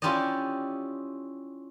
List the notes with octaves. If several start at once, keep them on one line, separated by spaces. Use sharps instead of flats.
C#4 E4 F4 G4 D5 D#5